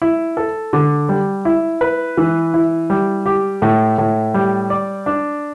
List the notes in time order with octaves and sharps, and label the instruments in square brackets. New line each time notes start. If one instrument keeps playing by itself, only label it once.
[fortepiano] E4
A4
D3
G3
E4
B4
E3
E4
G3
G4
A2
A2
G3
D5
D4